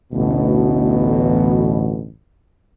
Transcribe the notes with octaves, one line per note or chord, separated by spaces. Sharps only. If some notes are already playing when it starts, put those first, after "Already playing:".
A1 D2 B2